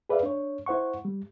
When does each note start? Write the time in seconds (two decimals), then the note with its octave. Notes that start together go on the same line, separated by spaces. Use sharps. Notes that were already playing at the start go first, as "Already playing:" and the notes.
0.09 G#4 B4 D5 E5 F5
0.23 D4 C#5
0.66 E4 C5 F#5 C#6
1.05 G3